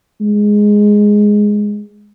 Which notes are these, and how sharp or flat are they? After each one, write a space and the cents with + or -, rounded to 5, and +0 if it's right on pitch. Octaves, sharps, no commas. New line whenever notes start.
G#3 +0